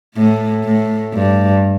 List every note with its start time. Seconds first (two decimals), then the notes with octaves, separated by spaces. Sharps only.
0.15 A2
0.64 A2
1.14 G2